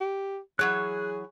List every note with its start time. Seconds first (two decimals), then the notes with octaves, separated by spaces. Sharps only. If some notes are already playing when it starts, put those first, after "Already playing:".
0.01 G4
0.59 E3 F#3 G#4 C#5 F#6